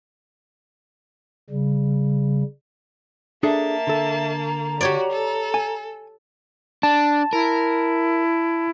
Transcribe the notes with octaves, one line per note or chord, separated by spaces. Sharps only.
C#3 G3
A#3 D4 G#4 A4 E5 A5
D3 A4
A#5
F#4 G4 C#5 D5
A4
G#5
D4 A5
E4 A#4